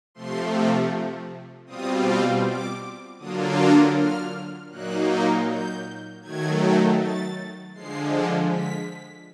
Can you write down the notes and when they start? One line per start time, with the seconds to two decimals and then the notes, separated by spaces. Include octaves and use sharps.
0.14 C3 F3 A3 C6
1.66 B2 G3 C4 F4 D#6
2.43 D6
3.19 D3 F#3 A#3 D4 F4 D#6
3.57 D#6
3.94 F6
4.70 A#2 F#3 A#3 D#4 F#6
5.47 G6
6.22 D#3 F#3 A3 G#6
6.98 A6
7.74 D3 F3 G#3 C7
8.50 B6